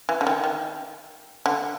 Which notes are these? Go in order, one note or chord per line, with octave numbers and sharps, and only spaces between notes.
E3
D3
D#3
D#3
D3